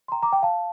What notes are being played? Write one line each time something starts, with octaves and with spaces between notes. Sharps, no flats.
C6
G5 A#5
A#5 D6
G5 A#5
F5 A5